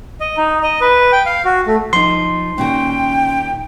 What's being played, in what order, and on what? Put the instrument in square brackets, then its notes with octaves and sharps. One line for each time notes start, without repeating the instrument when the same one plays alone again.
[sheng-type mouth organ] D#5
D#4
D#5
B4
G5
F5
F#4
A3
[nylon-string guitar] F3 D#4 [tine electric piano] C6
[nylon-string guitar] A#2 D#3 F#4 [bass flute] C#4 [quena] G5